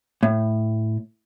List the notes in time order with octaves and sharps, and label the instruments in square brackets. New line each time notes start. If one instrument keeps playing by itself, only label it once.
[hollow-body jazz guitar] A2